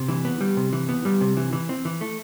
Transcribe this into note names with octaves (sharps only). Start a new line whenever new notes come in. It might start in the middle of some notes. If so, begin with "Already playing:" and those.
Already playing: C3
E3
B3
G3
C3
E3
B3
G3
C3
E3
E3
C4
E3
A3